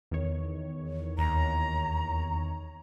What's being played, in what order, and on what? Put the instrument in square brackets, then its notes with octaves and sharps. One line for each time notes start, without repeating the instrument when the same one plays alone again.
[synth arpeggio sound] E2 D#3 C#5
[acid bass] D#2 [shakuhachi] A#5